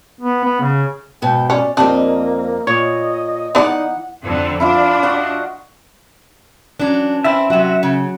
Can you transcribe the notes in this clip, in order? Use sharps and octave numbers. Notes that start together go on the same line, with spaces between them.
B3
B3
C#3
G#2 B2 G5
C#4 D5
F2 G3 A#3 C4 D4 D#5
A#2 C#5 D#5
E3 B3 D#4 D5 F#5
F2 D3
D4 E4 F4 D6
F#4 D#5 F#5
E3 F#3 C#4 D4
C4 E4 E5
C3 F#3 F#4 F#5
C#3